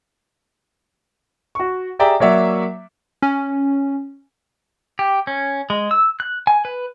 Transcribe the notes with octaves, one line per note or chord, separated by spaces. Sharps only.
F#4 C#6
G4 G#4 D5 E5 G5 A#5
F#3 A#3 C#5 D5 E5 F#5
C#4
G4
C#4
G#3
E6
F#6
G#5
B4